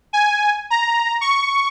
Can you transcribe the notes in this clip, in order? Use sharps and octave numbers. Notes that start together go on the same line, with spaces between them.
G#5
A#5
C#6